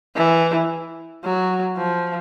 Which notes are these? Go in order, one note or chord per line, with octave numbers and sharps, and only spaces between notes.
E3
F#3
F3